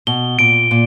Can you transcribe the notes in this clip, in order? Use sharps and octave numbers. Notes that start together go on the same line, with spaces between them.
B2 G7
A#2 D7
A#2